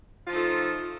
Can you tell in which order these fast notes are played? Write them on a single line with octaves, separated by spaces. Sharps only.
F4 F3 D#4 A3